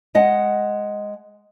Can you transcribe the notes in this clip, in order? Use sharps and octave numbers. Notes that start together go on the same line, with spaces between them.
G#3 D#5 F#5